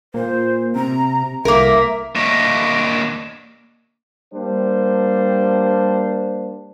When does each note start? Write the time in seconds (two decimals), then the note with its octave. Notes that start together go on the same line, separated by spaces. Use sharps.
0.14 A#2 C5
0.76 C3 A#5
1.45 C2 A#3 A#4 E5
2.16 A#3 D4 C#5 D#5 E5
4.34 G3 A#3 D4 C5